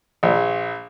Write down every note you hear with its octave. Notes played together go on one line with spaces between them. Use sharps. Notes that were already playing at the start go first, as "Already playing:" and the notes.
A#1